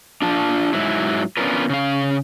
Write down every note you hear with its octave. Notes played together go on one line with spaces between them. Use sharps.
D4 F4 A5
G#2 F#3 E4
B3 C#4 D4 F4 A#4 B4
C#3 F5